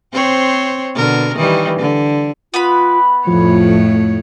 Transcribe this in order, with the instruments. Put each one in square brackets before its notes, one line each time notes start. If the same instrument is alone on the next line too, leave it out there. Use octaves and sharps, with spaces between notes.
[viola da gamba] C4 C5 C#5
B2 D3 A#4
D#3 E3 G3
D3
[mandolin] B3 B4 B5 [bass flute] F4
[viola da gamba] F2 A2 C#5 [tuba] F3 [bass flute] A3